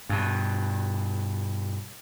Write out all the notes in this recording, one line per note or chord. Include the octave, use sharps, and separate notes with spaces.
G2 B2